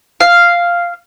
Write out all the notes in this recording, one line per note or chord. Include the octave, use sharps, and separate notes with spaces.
F5